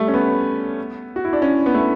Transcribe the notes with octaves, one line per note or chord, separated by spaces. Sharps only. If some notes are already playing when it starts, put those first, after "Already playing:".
Already playing: G3 A3
C#4
B3
F#4
E4
D4
C#4
B3
A3